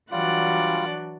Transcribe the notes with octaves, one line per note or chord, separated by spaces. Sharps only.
E3 F#3 G3 D4 F4 D5 F#5